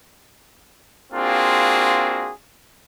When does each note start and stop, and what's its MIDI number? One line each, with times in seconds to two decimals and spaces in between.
1.13 2.32 58
1.13 2.32 60
1.13 2.32 62
1.13 2.32 65
1.13 2.32 66
1.13 2.32 68